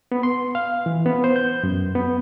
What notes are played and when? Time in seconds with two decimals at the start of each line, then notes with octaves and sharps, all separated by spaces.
0.12 B3
0.23 C6
0.55 F5
0.86 E3
1.06 B3
1.24 C5
1.36 G6
1.63 F#2
1.95 B3